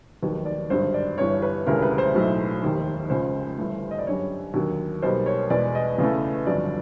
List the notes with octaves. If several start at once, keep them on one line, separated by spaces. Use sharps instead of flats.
F1 D#2 D#3 F#3 B4
D5
G#1 G2 D3 F#3 C5
D5
G1 G2 E3 C#5
B4
E1 D2 C#3 E3 G3 A#4
B4
C5
B1 A2 F#3 A3
F1 D#2 D#3
C#2 C#3 F3 G#3 C5
G1 G2 E3 A3
D#5
D5
G1 F#2 D3 G3 C#5
D#2 D3 F#3 A#3
B1 B2 G3 A#3 C5
C#5
E2 B2 G#3 D5
D#5
E2 C#3 E3 A3
G1 F2 D3 F#3 D5